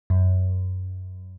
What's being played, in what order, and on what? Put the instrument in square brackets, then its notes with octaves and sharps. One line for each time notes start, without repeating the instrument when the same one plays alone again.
[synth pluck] F#2